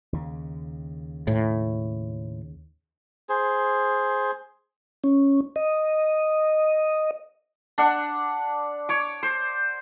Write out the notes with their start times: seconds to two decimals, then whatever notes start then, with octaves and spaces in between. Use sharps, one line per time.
0.13 D#2 C#3
1.27 A2
3.29 G#4 C5
5.04 C#4
5.56 D#5
7.78 D4 F#5
8.89 C#5 D6
9.23 C5